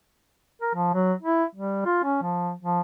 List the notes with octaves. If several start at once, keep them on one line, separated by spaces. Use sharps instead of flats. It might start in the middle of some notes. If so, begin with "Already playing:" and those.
A#4
F3
F#3
E4
G3
F4
C#4
F3
F3